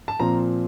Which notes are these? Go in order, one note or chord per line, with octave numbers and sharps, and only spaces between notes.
A5
A#2 F3 C4 A#5